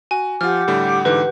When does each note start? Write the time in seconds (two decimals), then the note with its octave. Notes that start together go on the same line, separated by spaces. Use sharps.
0.11 F#4 G#5
0.41 F3 F4 G4 F#5 D6 F6
0.68 A2 D3 G3
1.05 G#2 D3 E3 B4